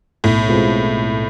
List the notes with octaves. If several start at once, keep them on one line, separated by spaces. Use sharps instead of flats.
B1 A2
B2 G#3 C4 F4